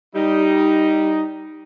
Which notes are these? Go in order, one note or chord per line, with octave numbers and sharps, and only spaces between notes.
G3 D#4